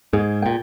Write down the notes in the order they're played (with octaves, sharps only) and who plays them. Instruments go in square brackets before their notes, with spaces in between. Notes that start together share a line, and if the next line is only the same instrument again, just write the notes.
[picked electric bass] G#2 [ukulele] G#4
[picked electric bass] A#2 [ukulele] G5